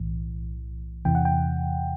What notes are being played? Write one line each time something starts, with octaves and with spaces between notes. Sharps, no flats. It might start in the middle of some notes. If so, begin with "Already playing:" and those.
Already playing: B1 A2 E3
E2 C3 E3 G5
F#5
G5